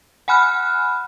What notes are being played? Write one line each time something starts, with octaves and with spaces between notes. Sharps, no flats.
F#5 G#5 B5 F6 F#6